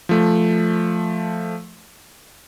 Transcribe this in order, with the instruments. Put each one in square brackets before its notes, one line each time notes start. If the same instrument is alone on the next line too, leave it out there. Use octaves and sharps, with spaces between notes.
[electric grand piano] F3 A3